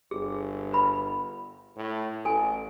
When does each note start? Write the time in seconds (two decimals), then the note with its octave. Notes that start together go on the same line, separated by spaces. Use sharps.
0.11 G1 G#4
0.72 B4 B5
1.76 A2
2.25 A1 A4 G#5